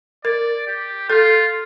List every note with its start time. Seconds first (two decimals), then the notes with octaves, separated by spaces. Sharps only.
0.25 A#4 D5
0.67 G4
1.09 F4 A4